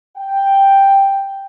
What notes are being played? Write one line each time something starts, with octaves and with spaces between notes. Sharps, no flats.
G5